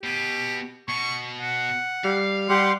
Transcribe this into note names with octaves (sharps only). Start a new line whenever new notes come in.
B2 G4
B2 C#6
F#5
G3 F5
G3 G4 F#5 C6